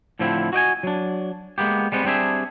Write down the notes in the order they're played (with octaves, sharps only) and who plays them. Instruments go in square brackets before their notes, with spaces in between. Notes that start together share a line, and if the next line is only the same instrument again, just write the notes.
[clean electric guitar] A2 D3 F3 C4 E4
F#4 D#5 G5 G#5
F#3 D4
G#3 A#3 B3 G4
G3 G#3 B3 C4
G3 C4 D4 G#4 E5